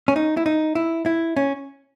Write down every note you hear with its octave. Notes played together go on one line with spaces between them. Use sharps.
C#4
D#4
E4
D#4
E4
E4
C#4